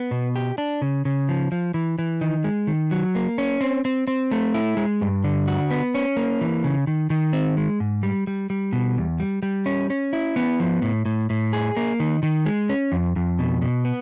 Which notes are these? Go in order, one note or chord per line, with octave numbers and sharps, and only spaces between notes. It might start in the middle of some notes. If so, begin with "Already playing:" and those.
Already playing: B3
B2
G4
D4
C#3
C#3
F3
F3
E3
E3
D#3
G#3
D#3
F#3
A#3
C#4
C4
C4
C4
A3
E4
G#3
G2
D3
F#4
B3
C#4
A#3
E3
C#3
D#3
D#3
C4
G#3
G#2
G3
G3
G3
B2
E2
G3
G3
C#4
C#4
E4
B3
F3
A2
A2
A2
G#4
A#3
D#3
D#3
G#3
C#4
F2
F2
B2
B2
B3